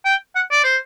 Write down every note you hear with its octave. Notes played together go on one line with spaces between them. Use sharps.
G5
F#5
D5
C5